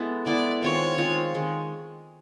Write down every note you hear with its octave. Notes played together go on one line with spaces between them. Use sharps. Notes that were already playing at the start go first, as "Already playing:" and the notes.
Already playing: G#3 B3 E4 A4
G#3 B3 E4 A4 D5
D#3 G#3 C4 F4 C#5
D#3 G#3 C4 F4
D#3 G#3